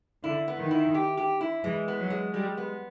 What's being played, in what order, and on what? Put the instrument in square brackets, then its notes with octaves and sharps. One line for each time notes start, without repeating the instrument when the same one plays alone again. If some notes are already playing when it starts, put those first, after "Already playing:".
[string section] D3 [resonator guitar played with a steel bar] E4
[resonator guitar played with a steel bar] B3
[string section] D#3
[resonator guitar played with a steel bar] E4
G4
G4
E4
[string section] E3 [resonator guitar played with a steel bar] G#3
[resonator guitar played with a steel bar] B3
[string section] F#3
[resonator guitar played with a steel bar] G#3
[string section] G3 [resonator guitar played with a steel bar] G#3
[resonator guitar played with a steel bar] B3